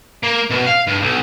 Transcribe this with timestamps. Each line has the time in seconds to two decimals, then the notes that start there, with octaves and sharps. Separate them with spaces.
0.23 A#3
0.50 B2
0.66 F5
0.87 G2
1.02 B1